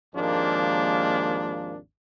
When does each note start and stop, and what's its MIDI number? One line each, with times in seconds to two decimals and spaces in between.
0.15 1.78 32
0.15 1.78 39
0.15 1.78 53
0.15 1.78 56
0.15 1.78 58
0.15 1.78 62